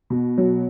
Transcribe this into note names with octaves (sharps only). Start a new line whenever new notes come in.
B2
F#3